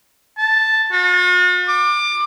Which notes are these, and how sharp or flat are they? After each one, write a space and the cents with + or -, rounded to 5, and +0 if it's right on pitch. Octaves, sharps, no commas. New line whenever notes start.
A5 +0
F#4 -45
D6 +25